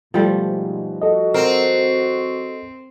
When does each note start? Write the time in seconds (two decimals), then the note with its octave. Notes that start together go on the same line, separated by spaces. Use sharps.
0.14 G#2 B2 F3 G3 A3
1.02 F#4 A4 D#5
1.34 C4 A#4